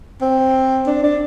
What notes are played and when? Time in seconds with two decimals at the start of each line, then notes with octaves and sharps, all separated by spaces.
0.21 C4
0.87 D4
1.03 D4